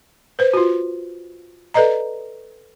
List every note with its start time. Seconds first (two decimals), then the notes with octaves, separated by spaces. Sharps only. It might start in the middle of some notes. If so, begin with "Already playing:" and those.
0.39 B4 C5
0.53 F4 F#4
1.74 A4 B4 D5 D#5 A#5